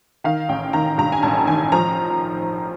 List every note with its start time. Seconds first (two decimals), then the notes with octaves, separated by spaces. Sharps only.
0.24 D#3 F5
0.49 A1 G5
0.73 D#3 A#5
0.98 G2 A#5
1.12 G#5
1.23 A1 A5
1.47 D#3 G#5
1.72 F3 A#5